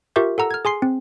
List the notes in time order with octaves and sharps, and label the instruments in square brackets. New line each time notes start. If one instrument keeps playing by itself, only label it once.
[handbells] F4 G4 A#4 E5 C#6 G6
A4 F#5 A#5 E6
F6 G#6
G#4 G#5 C6 C7
C4